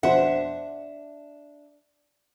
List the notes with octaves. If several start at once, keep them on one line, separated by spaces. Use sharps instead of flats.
F2 B2 D4 C5 E5 F#5